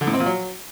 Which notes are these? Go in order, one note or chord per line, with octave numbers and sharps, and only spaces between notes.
D3
A2
C4
A#2
F#3